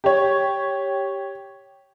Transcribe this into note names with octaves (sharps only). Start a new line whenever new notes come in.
G4 C#5